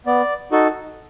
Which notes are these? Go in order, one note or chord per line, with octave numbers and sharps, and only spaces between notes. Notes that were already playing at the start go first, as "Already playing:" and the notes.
B3 D5
D#4 F#4 A4